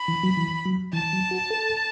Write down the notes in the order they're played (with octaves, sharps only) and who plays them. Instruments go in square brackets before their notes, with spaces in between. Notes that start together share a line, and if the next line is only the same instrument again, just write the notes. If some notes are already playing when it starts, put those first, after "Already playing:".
Already playing: [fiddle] B5
[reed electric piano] E3
F#3
E3
F#3
[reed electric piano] E3 [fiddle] A5
[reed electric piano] F#3
F#4
A4